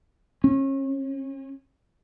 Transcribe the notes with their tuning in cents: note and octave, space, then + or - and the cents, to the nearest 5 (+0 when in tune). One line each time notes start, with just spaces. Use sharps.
C#4 -35